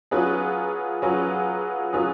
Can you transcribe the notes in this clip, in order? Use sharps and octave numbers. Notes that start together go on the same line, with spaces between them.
F#3 C#4 F4 G#4 B4
F#3 C#4 F4 G#4 B4
F#3 C#4 F4 G#4 B4